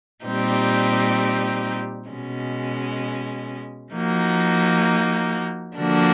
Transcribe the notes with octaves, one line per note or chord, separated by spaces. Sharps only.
A#2 G3 C4 D#4 G4
B2 G#3 C#4
F3 A#3 D#4 F#4
D3 F3 A#3 D4 F#4